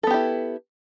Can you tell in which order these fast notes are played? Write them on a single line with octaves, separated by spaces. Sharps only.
A4 B3 G4 E4